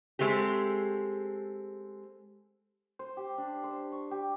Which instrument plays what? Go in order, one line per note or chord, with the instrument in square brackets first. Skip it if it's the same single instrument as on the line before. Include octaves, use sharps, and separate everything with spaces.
[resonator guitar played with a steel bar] G#3 A3 C4 G4
[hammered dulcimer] C5
G4
D4
C5
C#6
G4